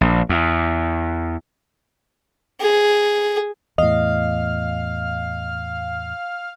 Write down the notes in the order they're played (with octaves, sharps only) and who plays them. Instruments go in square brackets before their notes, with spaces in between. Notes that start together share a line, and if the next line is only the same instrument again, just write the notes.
[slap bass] A#1
E2
[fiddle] G#4
[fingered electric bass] E2 A2 [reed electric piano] D#5 [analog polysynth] F5